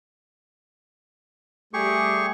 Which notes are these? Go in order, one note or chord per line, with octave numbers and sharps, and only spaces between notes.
G3 A3 G4 G#4 C#6